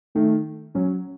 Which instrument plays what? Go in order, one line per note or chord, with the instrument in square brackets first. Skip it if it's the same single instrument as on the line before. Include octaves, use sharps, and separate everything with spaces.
[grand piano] D#3 [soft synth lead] A3
[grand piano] F#3 [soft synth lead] C#4